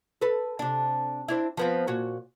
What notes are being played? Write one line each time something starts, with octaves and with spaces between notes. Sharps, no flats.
A4 B4
C3 D4
C4 D4 E4
F3 B3 C4
A#2 F#4 C#5